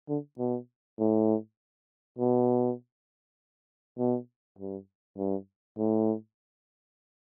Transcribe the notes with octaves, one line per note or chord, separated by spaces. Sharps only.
D3
B2
A2
B2
B2
G2
G2
A2